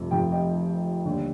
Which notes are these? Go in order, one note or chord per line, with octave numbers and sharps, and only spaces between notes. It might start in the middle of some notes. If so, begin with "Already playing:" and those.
Already playing: F1 F2 C3
F1 F2 C3 G5
D#5 G5
D#2 D3 G3